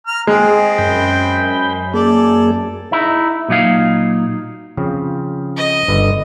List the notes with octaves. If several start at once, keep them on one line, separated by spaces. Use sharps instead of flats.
A#5 F6
G#3 C4 G#4
F#2 B5 G6
A#3 G#4 A4 D5
D#4 E4
A#2 F#3 D#4 F5
C#3 F3 C4
D#5
G1 D3 B4